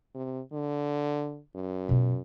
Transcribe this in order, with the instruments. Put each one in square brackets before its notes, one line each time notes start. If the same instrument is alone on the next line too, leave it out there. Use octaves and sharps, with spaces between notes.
[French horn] C3
D3
F#2
[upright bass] B2 F4